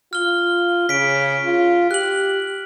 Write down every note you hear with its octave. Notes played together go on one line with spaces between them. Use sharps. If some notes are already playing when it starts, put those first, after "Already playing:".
F4 F6 G7
C#3 B6 D7
F4
G4 F#6 F#7